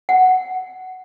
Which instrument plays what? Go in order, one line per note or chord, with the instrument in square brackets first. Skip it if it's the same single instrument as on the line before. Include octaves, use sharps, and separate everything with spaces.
[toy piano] F#5